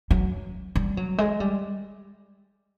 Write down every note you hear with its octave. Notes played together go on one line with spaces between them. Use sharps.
F#3
G3
F#3
G#3
G3